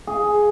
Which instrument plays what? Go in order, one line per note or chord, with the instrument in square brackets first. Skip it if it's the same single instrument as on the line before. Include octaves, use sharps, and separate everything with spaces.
[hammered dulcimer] G#4